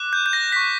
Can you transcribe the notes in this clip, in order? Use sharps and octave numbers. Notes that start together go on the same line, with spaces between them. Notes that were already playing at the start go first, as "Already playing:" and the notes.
Already playing: D6 F#6
G6
G6
A#6
C#6 G6 B6